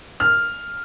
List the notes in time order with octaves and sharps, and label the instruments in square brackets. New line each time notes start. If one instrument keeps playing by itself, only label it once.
[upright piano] F6